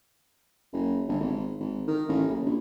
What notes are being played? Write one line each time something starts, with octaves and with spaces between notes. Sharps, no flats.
F#1
G1
G#1
G#1
D#3
A1
F#1
A#1